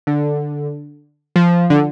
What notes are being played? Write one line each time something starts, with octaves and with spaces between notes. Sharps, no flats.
D3
F3
D3